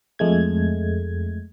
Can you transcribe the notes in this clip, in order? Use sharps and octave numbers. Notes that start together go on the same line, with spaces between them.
F2 G#3 A3 G#6